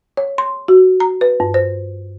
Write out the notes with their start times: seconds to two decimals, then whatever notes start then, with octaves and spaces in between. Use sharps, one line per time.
0.17 C#5
0.38 C6
0.68 F#4
1.00 A#5
1.21 B4
1.40 G2
1.54 C5